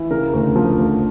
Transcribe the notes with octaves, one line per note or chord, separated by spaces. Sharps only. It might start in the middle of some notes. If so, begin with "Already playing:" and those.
Already playing: E3
C#3 A#4
D2
F3
D2